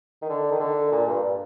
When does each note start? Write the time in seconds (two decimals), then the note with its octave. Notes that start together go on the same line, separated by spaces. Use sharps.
0.22 D#3
0.29 D3
0.51 D#3
0.60 D3
0.91 A#2
1.07 G2